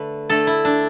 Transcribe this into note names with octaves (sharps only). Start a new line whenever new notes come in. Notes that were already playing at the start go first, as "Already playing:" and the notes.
Already playing: D3 A3 B4
D3 A3 A4
E4
D4